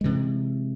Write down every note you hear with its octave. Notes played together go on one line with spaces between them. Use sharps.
C3 E3 G#3